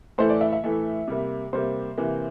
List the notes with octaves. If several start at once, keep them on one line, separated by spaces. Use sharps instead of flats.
A2 E3 A3 C5
D5
E5
E5
A2 E3 A3
C3 G3 A#3
C3 G3 A#3 C5
C3 E3 A#3